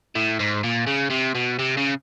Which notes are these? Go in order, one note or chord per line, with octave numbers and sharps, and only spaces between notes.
A2
G#2
A#2
C#3
C3
B2
C3
C#3